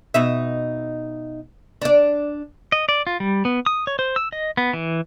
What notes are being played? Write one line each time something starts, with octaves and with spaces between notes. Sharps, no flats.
B2 D#4 E5
D4 D5
D#5
D5
F4
G3
B3
D#6
C#5
C5
E6
D#5
B3
E3